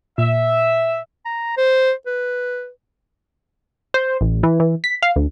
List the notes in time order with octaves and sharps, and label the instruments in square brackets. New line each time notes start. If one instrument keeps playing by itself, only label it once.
[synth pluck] A#2 [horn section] E5
[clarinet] A#5
C5
B4
[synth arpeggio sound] C5
A1
E3
E3
B6
F5
D2